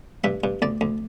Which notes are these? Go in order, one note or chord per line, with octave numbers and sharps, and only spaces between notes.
G2 E5
G2
D2 D5
D2